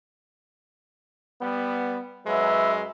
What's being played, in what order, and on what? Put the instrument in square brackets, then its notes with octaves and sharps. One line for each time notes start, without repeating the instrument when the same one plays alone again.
[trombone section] G3 B3
[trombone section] F#2 F#3 G#3 [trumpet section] B4 E5